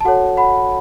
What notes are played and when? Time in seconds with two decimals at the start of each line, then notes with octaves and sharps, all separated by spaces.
0.01 A5
0.05 F#4 A4 C#5 F#5
0.37 F#5 B5